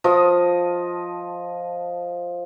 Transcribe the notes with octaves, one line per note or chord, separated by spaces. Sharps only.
F3 D#5